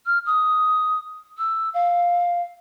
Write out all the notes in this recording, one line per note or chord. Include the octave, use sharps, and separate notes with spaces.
F6
D#6
E6
F5